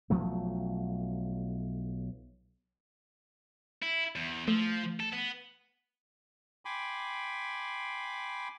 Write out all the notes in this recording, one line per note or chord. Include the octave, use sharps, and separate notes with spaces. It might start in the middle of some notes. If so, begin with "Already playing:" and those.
B1 F3 F#3 A3
E4
E2
F3 A3
A4
B3
G5 G#5 B5 C6 D6